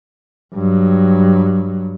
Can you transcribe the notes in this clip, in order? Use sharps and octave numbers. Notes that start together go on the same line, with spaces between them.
G2 F#3